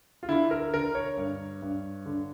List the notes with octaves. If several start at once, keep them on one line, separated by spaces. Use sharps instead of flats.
F4
D3 E4
A#4
D3 A#4
C#5
G2
G2
D3